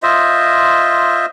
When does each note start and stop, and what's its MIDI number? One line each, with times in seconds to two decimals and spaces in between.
0.03 1.26 65
0.03 1.26 72
0.03 1.26 75
0.03 1.26 76